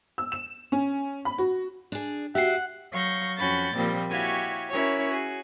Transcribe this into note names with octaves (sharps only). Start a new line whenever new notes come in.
E6
E7
C#4
B5
F#4
D4 G#4
F#4 G4 E5 F#5 C7
F#3 F5 C#6 G6 A#6
F2 C#4 F#4 B5 G6 A6
A#2 F3 G3 A#3 C4
E4 F#4 G4 C#5 F5 G#5
C#4 E4 F#4 A#4 C#5
F#4 G#4